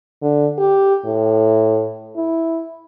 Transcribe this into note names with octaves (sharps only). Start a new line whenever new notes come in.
D3
G4
A2
E4